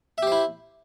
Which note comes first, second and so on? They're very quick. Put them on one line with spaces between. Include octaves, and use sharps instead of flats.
E5 G4 C5 E4